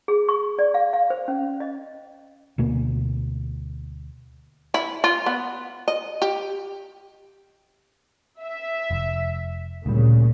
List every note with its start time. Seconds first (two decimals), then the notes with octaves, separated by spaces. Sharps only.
0.08 G#4
0.29 C#6
0.59 D5
0.74 F5
0.93 F5
1.10 C5
1.28 C#4
1.60 D#5
2.58 D2 B2 A#3
4.74 E4
5.04 F4
5.26 B3
5.88 D#5
6.22 G4
8.41 E5
8.91 F1
9.86 D2 A#2 C#3 G3